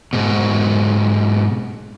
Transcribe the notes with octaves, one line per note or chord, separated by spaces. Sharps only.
G#2 B2